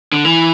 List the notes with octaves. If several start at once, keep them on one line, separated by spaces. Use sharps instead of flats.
D3
E3